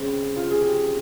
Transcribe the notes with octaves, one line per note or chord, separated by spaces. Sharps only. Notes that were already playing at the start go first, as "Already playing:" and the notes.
Already playing: C#3 G3 C4 E4 G#4
F4
G#4
G4